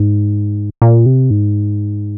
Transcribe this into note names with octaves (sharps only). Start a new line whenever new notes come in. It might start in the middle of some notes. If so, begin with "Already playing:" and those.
Already playing: G#2
A#2
C3
G#2